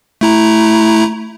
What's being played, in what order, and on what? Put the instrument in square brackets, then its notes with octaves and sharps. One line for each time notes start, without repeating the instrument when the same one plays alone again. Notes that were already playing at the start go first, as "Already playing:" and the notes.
[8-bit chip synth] A3 E4 A#5